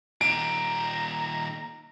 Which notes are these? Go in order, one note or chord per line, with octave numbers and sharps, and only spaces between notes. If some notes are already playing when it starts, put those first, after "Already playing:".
A#2 D#3 A#5 D7